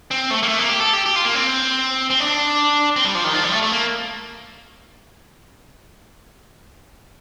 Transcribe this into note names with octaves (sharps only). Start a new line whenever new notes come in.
C4
A3
A#3
A3
A#3
G4
A4
G4
G4
F4
A#3
C4
C4
D4
C4
G3
F3
D#3
F3
G3
A3
A3
A#3